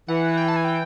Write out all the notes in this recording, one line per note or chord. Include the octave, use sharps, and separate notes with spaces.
E3 F#5
G5
A5
G#5
G5